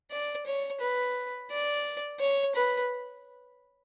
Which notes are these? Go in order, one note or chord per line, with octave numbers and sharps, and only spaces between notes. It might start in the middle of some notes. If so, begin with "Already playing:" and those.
D5
C#5
B4
D5
C#5
B4